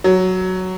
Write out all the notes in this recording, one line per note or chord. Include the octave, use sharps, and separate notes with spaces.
F#3